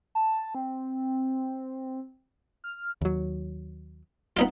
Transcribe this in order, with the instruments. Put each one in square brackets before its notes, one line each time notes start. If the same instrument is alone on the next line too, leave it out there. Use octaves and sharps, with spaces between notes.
[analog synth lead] A5
C4
F6
[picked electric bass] D#2 F#3
[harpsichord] B3 D#4 F4